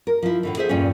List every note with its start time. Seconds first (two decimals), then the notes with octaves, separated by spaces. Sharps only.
0.07 A#4
0.23 F3 E4
0.43 A2 D3 E3
0.57 G#4 A4 C5 E5
0.69 E2 G2 A#2 C4 C#4